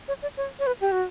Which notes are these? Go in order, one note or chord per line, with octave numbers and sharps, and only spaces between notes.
C#5
D5
C#5
C#5
B4
G4
F#4